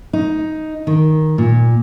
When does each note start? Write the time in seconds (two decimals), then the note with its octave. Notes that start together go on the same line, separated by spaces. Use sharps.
0.13 D#4
0.87 D#3
1.38 A#2